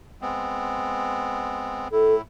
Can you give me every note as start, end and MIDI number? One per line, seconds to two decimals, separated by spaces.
0.22 1.88 56
0.22 1.88 59
0.22 1.88 60
1.92 2.22 45
1.92 2.22 64
1.92 2.15 69